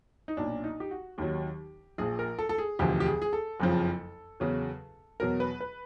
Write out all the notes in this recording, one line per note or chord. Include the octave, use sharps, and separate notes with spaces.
D#4
B1 A#2 F#3 D4
D#4
G4
F#4
D#2 D#3 F#3 G4
A#1 A#2 F3 G#4
A#4
A4
A4
G#4
E1 D2 D3 F3 G4
G4
G#4
G#4
A4
F#1 F2 C#3 F3
E2 C#3 F#3
E2 B2 F#3 A#4
B4
B4